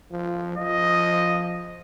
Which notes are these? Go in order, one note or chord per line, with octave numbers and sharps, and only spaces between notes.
F3
F3 D#5